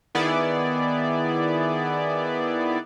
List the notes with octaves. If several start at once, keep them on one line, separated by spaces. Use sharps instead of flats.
D#3 B3 E4 G#4 D5